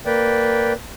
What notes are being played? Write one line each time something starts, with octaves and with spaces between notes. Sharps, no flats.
A#3 B4 D5 G5